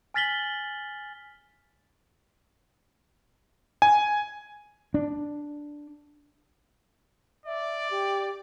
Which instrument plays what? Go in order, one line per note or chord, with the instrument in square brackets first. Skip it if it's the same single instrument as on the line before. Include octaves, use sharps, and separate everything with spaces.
[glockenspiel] G#5 F6 A6 B6 F#7 G7
[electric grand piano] G#5
[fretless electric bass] D4
[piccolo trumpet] D5 [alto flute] E5
[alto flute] G4